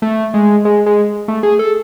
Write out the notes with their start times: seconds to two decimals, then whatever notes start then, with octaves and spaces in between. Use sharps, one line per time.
0.02 A3
0.34 G#3
0.65 G#3
0.86 G#3
1.28 A3
1.43 G#4
1.59 A4